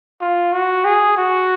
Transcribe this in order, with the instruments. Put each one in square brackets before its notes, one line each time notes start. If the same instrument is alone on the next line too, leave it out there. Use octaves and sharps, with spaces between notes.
[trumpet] F4
F#4
G#4
F#4